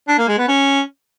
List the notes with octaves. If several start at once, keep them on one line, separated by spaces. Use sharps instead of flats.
D4
A#3
G#3
B3
C#4